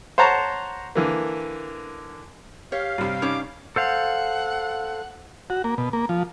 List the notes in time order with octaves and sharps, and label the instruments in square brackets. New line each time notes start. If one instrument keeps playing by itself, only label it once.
[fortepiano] C5 C#5 F#5 A5 A#5 C#6
D3 E3 A#3
[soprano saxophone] G4 [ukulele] C#5 [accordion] F5
[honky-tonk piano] G2 C3 [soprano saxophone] G4
[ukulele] C#4 D#4 C#5 [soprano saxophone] D6
[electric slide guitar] A4 C5 F5 [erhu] F#5
[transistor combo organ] F#4
A#3
B2
A#3
F3